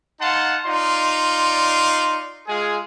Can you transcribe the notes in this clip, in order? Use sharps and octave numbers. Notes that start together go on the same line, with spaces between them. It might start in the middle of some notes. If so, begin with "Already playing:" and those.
D#4 F5 F#5 A5 C6
D#4 F4 D5 C6
G#3 F4 G#4